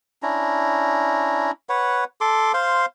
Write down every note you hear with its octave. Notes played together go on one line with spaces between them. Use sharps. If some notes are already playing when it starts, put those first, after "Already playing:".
C#4 D4 E4 A#5
B4 C#5 F#5
A4 C6 D6
C5 F5 C6